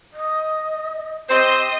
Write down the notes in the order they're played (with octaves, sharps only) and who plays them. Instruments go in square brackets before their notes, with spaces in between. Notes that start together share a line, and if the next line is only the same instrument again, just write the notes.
[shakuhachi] D#5
[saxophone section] C4 G4 C5 [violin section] D#5